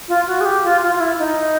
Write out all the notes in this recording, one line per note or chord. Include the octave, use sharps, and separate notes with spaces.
F4
F#4
G#4
G4
F4
F4
F4
E4
D#4